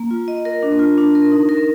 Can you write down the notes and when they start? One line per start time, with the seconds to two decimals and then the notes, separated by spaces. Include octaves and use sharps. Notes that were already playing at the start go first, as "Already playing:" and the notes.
Already playing: A#3
0.11 F4
0.28 D#5
0.45 A#4
0.63 D4
0.79 F4
0.98 D4
1.15 A#4
1.32 D#4
1.49 A#4